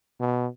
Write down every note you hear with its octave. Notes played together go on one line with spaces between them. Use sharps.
B2